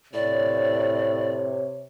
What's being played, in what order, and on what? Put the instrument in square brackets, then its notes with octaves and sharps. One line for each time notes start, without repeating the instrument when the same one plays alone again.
[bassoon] A2 [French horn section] C3 C#5 [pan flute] D5